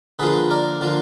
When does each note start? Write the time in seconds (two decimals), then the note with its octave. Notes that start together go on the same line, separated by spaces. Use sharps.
0.19 D3 F3 A#3 F4 G#4 B4
0.51 A#4 D5
0.81 D3 F3 A#3 F4